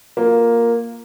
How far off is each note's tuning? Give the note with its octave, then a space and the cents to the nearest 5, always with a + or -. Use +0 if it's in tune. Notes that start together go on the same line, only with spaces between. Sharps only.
A#3 +0 F4 +10